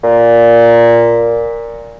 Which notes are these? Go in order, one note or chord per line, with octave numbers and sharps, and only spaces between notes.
A#2